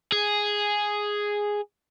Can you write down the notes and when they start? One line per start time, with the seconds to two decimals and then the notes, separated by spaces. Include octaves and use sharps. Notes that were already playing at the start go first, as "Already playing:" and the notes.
0.12 G#4